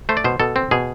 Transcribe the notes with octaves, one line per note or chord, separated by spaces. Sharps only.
A3 C5
D5
B2 C5
B2 A4
C4
B2 G#4